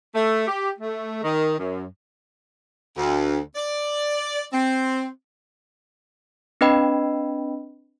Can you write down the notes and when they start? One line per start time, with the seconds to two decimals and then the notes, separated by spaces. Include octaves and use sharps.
0.13 A3
0.48 G4
0.79 A3
1.23 D#3
1.57 F#2
2.97 D2
3.56 D5
4.52 C4
6.61 C4 D4 B4 D#5 G5 B5